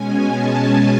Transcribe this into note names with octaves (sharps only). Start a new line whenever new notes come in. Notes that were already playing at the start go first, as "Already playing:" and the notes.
Already playing: B2 G#3 C#4 G#5
A5